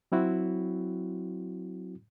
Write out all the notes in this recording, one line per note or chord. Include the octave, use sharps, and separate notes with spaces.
F#3 C4 E4 F#4